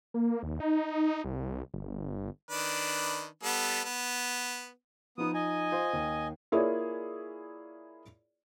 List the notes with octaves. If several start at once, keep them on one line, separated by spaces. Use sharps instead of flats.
A#3
D#2
D#4
C2
G1
D#3 D4 B4
G3 B3 A4
B3
F3 B3 D#4 D#6
D#5 G#5
F4 C5
D#2
A#3 E4 F4 G#4 C#5 D5